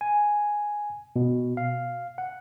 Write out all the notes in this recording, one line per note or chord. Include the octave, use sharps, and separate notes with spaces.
G#5
B2
F5
F#5